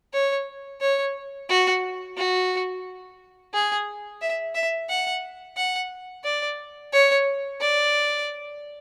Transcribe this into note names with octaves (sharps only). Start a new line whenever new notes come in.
C#5
C#5
F#4
F#4
G#4
E5
E5
F#5
F#5
D5
C#5
D5